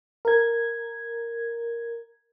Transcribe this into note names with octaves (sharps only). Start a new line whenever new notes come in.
A#4 G#6